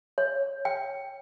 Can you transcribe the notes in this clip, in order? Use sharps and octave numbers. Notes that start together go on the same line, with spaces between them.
C#5
G5